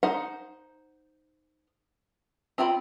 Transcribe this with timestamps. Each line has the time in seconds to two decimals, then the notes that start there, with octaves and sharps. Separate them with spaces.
0.03 D#4 C5 F#5
2.58 C4 F4 G5 A#5 B5